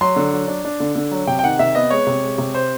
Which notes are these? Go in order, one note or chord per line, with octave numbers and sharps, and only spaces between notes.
F#3 C6
D3
F#3
D4
D4
D3
D3
F#3
C3 G5
G5
D#3 F#5
C3 E5
B3 D#5
G#3 C#5
C3
G#3
C3
C5